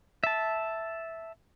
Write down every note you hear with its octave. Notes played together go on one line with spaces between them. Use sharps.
E5 A5